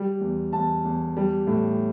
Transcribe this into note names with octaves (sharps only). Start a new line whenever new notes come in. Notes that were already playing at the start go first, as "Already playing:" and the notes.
Already playing: G3
E2
E2 A5
E2
G3
A2